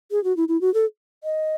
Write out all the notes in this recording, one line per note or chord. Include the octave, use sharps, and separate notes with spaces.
G#4
F#4
E4
E4
F#4
A4
D#5